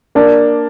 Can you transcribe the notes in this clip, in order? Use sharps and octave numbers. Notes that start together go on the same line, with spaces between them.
A#3 D4